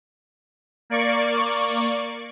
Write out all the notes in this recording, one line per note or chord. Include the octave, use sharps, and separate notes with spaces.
A#3 D5 C#6